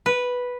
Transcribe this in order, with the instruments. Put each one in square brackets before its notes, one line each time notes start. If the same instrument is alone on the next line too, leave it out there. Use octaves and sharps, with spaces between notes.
[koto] B4